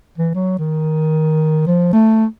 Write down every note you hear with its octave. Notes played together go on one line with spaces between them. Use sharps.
E3
F#3
D#3
F3
A3